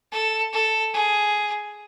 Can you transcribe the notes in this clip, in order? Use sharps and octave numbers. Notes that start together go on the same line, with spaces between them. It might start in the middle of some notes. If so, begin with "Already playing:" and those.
A4
A4
G#4